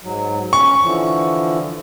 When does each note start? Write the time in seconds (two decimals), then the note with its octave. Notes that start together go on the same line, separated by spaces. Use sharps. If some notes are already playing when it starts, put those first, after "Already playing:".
0.03 G#2 F#3
0.53 C#4 C#6
0.82 D3 E3 F3